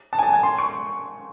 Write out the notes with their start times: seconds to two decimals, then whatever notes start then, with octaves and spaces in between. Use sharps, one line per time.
0.13 A5
0.19 G#5
0.23 A5
0.33 G#5
0.43 C6
0.59 C#6